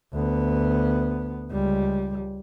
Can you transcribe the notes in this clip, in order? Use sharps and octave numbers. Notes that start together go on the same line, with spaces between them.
D2 B3
C#2 G3